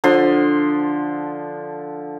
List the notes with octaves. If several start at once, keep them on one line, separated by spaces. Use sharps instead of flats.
D3 F3 C6